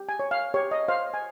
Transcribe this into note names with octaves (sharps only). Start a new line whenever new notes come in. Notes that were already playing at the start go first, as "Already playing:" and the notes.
Already playing: G4
G#5
C#5
F5
G4 C#5
D#5
C5 F5
G#5